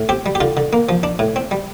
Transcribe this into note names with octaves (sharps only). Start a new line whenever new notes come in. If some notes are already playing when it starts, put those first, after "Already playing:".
Already playing: A2
C4 G4
G3
G4
D3 F4
D3
A#3
F3
D4
A2
C4
G3